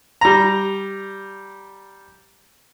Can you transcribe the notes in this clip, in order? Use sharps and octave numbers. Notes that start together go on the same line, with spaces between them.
G3 A#5